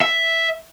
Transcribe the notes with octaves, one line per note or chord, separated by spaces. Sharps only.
E5